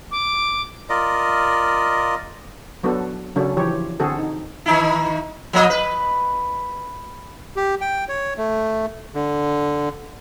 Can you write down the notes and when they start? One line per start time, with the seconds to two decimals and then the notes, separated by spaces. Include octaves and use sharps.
0.11 D6
0.89 F4 A#4 D5 D#5
2.83 F#3 B3 D4 A4
3.36 C#3 F#3 C#4 D4 A4
3.57 E3 F3 G4 C#5
4.00 D3 C4 F#4 G#4 A4
4.18 D#4
4.66 D#3 D#4 E4
5.53 F3 A#3 D#5
5.70 B4
7.56 G4
7.81 G5
8.09 C#5
8.37 A3
9.14 D3